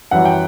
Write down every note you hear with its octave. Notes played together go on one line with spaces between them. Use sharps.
F#2 E3 G3 F#5
G5